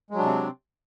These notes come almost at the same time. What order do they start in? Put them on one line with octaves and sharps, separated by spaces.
G#3 F#3 D4 C3 C4